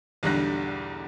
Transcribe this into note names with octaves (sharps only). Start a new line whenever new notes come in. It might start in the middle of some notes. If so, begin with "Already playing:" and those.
B1 E2 D3 G3 F#6 A#6